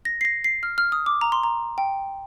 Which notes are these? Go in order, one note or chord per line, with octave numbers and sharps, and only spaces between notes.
A#6
C7
A#6
C7
F6
F6
D#6
D6
A#5
C6
A#5
G5